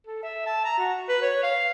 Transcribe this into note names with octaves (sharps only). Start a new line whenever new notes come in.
A4
E5
A5
A#5
F#4
B4
C#5
F5